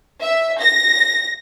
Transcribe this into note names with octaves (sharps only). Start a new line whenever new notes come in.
E5
A#6